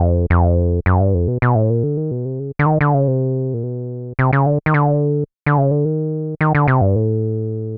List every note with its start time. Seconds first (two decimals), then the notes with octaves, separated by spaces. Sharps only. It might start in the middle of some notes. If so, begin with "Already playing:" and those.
Already playing: F2
0.30 F2
0.86 F#2
1.00 G2
1.14 F2
1.28 B2
1.42 B2
1.55 A2
1.70 A#2
1.83 D3
1.97 D#3
2.11 B2
2.25 C3
2.39 C#3
2.59 D3
2.66 D#3
2.81 D3
2.94 C#3
3.08 C3
3.54 A#2
3.63 B2
4.19 C3
4.33 C#3
4.46 D3
4.66 D#3
4.74 D3
5.46 D3
5.58 C#3
5.71 D3
5.85 D#3
6.41 D#3
6.55 D3
6.68 C3
6.81 G2
6.96 A2